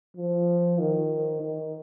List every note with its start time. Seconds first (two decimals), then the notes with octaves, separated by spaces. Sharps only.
0.17 F3
0.79 D#3
1.41 D#3